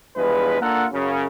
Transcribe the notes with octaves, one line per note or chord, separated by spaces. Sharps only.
E2 G2 F3 G#3 B4
A#3 D4 F4 A4 A#4 F#5
F#2 C#3